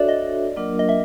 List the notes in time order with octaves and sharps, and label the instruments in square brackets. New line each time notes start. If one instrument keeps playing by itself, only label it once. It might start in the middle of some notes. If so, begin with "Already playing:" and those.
Already playing: [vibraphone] D4 F#4 A4 C#5 E5 [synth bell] D5
[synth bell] D#5
[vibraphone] F#3 A#3 D4 F4 A#4
[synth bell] D#5
E5